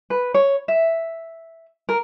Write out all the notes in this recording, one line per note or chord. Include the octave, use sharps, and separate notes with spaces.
B4
C#5
E5
A#4